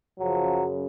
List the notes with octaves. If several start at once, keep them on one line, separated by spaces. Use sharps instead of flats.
F#2 C#3 F3 F#3